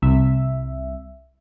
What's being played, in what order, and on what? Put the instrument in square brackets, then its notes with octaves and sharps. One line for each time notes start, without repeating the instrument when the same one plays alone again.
[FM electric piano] C2 E5